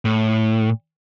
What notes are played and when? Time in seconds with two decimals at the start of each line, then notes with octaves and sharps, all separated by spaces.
0.05 A2